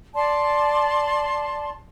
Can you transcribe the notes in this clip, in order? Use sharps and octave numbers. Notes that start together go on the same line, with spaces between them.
D5 A5 C6